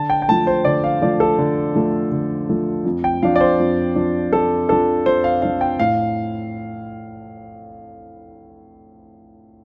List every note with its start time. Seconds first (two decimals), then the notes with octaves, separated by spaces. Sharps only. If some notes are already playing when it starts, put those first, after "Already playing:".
Already playing: D3 A5
0.10 G5
0.22 G5
0.28 F3 A3 A5
0.47 C5
0.65 D3 D5
0.84 F5
1.01 F3 A3 D5
1.20 A4
1.39 D3
1.75 F3 A3
2.12 D3
2.49 F3 A3
2.85 F2
3.04 G5
3.23 F3 D4 F5
3.36 D5
3.41 C5
3.60 F2
3.96 F3 D4
4.32 F2 A4
4.69 F3 D4 A4
5.06 F2 C5
5.24 F5
5.42 F3 D4 F5
5.61 G5
5.79 A2 F5